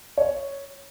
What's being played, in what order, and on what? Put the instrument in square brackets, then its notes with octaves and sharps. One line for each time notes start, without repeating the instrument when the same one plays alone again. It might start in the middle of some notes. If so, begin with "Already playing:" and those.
[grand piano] C#5